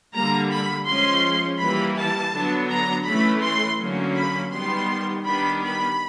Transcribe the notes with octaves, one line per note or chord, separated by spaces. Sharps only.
D3 G3 A#3 A#5
B5
F3 G#3 C#4 C6
E3 G3 A#3 B5
A5
D3 F#3 B3 D4
A#5
E3 A3 C#4 B5
C6
D3 F#3 A#3 C#4
B5
D#3 G3 B3 C6
D#3 G3 B3 D4 B5
B5